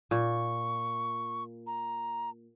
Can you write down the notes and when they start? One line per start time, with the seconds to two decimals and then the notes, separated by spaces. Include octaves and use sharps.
0.11 A#2 C#6
1.67 A#5